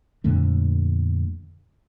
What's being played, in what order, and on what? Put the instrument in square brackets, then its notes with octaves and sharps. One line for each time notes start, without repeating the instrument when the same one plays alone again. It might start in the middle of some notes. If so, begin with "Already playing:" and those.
[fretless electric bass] F2 A#2 D3 A3